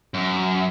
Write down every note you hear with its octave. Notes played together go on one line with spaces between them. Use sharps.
F#2